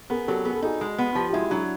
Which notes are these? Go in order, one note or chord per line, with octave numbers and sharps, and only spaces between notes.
B3 G#4 A#4
F#3 G4 A4
B3 G#4
A4
D#4 F#4 G#4
G#3
B3
F3 F4 G4
G4
G#3 E4 F#4
F#3 D4 E4